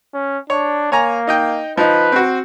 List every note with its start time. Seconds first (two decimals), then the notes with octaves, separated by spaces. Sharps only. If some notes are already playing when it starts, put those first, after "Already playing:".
0.14 C#4
0.50 D4 C#5
0.92 A#3 C#5 G#5 A#5
1.27 D#4 D#5 G5
1.77 F3 D#4 B4
2.12 C4 F#4